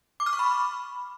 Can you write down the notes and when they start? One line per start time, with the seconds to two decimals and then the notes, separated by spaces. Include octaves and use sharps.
0.20 D6
0.26 F6
0.33 C#6
0.39 B5